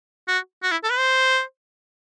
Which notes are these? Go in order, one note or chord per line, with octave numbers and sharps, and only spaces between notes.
F#4
F#4
E4
A4
B4
C5